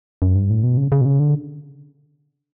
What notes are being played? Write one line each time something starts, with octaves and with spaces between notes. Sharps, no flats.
F#2
G2
A2
B2
C#3
C#3
B2
C#3
D3